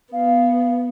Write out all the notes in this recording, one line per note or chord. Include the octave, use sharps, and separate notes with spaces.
B3 F5